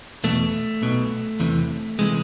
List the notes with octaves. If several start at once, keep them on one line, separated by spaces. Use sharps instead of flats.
E2 B2 A3
B1 B2
E2 C3 E3
C3 E3 G#3